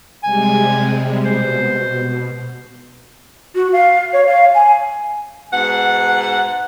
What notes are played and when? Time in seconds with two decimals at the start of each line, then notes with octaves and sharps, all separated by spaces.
0.24 C3 G3 G#3 G#5
1.25 B2 C5
3.55 F#4
3.73 F5
4.13 C#5
4.27 F5
4.55 G#5
5.53 G#2 B2 F#5